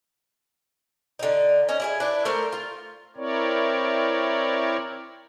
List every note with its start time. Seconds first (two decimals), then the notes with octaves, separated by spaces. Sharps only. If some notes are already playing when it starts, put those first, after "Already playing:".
1.19 D3 D#4
1.69 C#4 D#5
1.80 E4 G4 G#4
2.00 D4 E4 B4
2.25 A3 A#4 C5
2.53 F4
3.16 C4 E4 A#4 C#5 D5